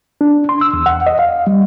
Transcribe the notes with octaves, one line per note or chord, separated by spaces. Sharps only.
D4
C6
E6
E2
F#5
D#5
F5
G3